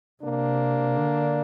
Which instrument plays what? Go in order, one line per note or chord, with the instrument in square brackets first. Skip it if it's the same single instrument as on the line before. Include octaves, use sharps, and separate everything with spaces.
[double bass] C3 [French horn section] A#3 D4
[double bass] D3